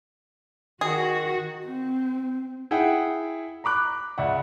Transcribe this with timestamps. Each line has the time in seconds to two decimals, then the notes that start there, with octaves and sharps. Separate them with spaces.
0.81 D#3 F#4 G#4
1.65 C4
2.71 E4 G#4 F#5 G5
3.64 A#5 B5 D6 F#6
4.18 C#2 D5 E5 F#5